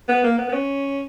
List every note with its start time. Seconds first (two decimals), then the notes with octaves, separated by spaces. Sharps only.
0.08 B3
0.24 A#3
0.38 B3
0.49 B3
0.53 C#4